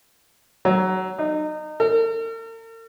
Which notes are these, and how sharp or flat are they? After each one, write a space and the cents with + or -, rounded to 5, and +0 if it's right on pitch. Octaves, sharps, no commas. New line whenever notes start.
F#3 +20
D#4 -25
A#4 -45